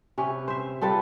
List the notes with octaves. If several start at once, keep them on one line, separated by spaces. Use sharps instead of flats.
C3 C#4 B4
C5 E5
G3 F4 A4 B4